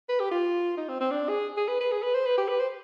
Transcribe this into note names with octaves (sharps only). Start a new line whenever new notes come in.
B4
G4
F4
D#4
C4
C4
D4
G#4
G#4
B4
B4
G#4
B4
C5
B4
G4
B4
C5